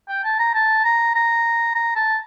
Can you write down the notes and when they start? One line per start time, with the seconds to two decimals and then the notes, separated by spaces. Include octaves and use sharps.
0.09 G5
0.24 A5
0.39 A#5
0.54 A5
0.84 A#5
1.15 A#5
1.75 A#5
1.96 A5